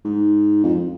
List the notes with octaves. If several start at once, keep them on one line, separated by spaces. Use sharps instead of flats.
G#2
F2